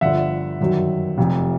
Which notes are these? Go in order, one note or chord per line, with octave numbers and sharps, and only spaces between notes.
G1 G2 D3 F3 E5 F#5
G1 F#2 D#3 F#3
F1 F2 C3